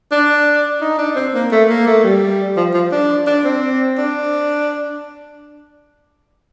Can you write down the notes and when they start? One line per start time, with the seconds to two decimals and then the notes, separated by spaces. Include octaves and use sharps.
0.12 D4
0.81 D#4
0.98 D4
1.16 C4
1.34 A#3
1.51 A3
1.70 A#3
1.87 A3
2.04 G3
2.57 F3
2.74 F3
2.92 D4
3.27 D4
3.44 C4
3.98 D4